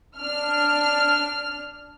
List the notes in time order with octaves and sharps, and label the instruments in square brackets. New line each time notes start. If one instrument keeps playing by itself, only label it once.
[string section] D4 F6